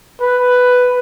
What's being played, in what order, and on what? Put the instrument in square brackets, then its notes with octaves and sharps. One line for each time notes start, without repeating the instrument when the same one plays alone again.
[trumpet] B4